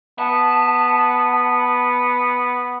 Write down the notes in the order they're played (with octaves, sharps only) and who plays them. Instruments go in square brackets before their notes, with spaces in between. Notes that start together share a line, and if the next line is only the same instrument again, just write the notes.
[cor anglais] B3 [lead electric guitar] A5